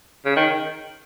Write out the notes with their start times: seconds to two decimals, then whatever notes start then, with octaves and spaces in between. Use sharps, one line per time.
0.25 C#3
0.36 D#3